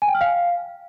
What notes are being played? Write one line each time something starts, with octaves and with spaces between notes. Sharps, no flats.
G#5
G5
F6
F5